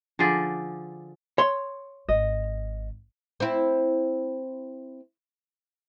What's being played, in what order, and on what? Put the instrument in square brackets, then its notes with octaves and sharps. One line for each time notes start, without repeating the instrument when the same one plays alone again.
[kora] D3 F3 G#4 D5
[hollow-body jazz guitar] C#5 C6
[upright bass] G#1 [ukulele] D#5
[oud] C4 E4